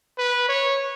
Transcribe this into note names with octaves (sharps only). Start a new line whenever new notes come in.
B4
C#5